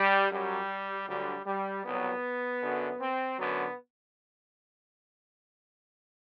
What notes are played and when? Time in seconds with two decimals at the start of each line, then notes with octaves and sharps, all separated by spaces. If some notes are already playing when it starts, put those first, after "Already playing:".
Already playing: G3
0.31 F#2 F#3 G3
1.07 D2 D3 F#3 G3
1.46 G3
1.85 C2 B2 F#3 B3
2.61 F#2 D3 F#3
3.00 C4
3.38 F#2 D3 F#3 B3